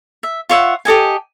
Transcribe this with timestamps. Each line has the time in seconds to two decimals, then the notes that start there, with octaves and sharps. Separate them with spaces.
0.23 E5
0.49 F4 C#5 E5 F#5
0.85 G4 A4 D#5 G#5